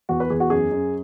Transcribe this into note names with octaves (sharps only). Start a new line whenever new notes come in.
E2 F#4
B4
E2 G#4
F#4
F#2 G#4
F#2